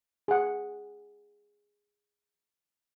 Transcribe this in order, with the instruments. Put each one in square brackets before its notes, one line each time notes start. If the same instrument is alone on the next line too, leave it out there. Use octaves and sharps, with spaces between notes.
[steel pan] G#4 F#5